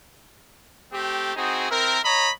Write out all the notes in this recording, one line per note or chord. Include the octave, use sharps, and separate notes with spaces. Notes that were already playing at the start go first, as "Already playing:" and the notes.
A3 C4 G4
C4 D#4 F#4 G#4
C4 E4 A#4
C#5 D#5 A#5 B5